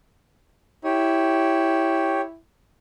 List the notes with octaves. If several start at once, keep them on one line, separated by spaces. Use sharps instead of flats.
E4 G4 C#5